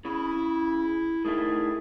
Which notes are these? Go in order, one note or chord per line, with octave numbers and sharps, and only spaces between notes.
C#3 E4
A2 D#3 A3 G#4